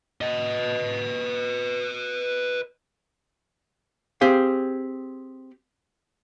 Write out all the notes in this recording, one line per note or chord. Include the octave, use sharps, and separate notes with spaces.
B4 D#5
C4 G4 G#4 F5